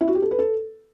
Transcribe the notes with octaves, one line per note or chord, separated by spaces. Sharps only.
E4
F#4
G4
A4
B4
A4